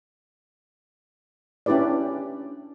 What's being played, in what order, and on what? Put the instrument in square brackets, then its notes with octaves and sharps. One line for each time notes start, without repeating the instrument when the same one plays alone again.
[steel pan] C#4 D4 E4 G4 B4 D5